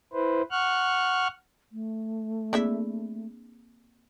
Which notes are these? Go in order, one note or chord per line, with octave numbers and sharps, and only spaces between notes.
E4 B4 C5
F#5 C#6 F6 F#6
A3
A#3 C4 D4 E4 G#4 E5